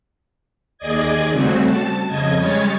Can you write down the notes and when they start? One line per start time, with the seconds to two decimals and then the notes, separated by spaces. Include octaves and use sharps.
0.78 D#2 G#4 D5 D#5 G#6
1.32 C#3 G3 A3 C4 F#4
1.65 A5
2.07 F2 C#3 D#5 G#6
2.37 G3 G#3 C#5 A6